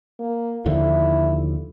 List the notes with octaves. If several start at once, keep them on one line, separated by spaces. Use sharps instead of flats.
A#3
D#2 D3 F3 E4